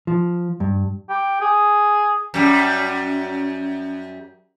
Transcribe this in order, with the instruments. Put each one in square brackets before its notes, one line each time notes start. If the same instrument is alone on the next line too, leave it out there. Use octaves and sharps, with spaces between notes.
[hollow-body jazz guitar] F3
G2
[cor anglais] G4
G#4
[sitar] F#2 G3